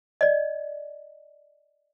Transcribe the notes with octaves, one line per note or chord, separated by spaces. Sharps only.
D5 D#5